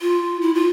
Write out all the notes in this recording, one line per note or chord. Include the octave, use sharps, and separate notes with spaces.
F4
E4
F4